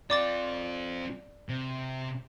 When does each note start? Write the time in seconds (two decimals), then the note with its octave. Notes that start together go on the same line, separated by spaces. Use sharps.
0.10 C4 F4 D5 D6 A6
1.49 C3